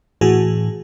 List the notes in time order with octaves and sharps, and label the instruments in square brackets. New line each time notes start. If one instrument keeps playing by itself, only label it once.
[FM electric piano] A2 E3 F#4 G#4